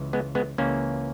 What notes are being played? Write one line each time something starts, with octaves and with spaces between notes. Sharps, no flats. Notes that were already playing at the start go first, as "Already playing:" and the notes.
Already playing: C#2 C#3 E3
G#3 B3
G#3 B3
C#2 C#3 E3 A#3 C#4